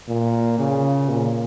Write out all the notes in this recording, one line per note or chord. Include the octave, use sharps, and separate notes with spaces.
A#2
C#3
A#2